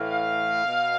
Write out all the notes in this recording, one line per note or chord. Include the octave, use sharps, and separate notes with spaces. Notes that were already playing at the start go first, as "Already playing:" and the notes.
Already playing: A2 E3 F5
B2